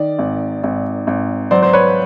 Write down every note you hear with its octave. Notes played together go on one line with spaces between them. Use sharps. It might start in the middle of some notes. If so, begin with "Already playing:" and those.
Already playing: D#3 D5
G#1
G#1
G#1
F#3 C5 D5
C5
B4 C#5